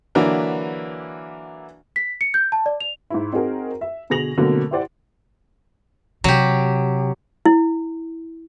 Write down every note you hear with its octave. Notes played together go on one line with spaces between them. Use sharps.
D3 E3 F#3 A#3 D4 B4
B6
C#7
G6
A5
D5
F7
G#2 E4
C4 D#4 F#4 G#4 A#4
E5
B2 D3 G#4 A#6 F7 F#7
B2 D3 F#3 A3 A#3 C4
E4 G4 C5 D5 F#5
C3 F#3 G4
E4